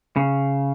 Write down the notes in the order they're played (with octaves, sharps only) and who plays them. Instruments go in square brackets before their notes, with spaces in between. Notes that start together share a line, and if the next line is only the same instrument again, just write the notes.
[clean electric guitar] C#3